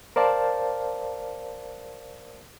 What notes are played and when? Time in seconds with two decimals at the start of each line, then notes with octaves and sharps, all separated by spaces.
0.16 A#4 C5 D5 F5 A5